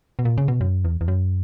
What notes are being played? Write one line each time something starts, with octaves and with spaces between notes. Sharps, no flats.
B2
A#2
C#3
B2
F#2
E2
E2
F#2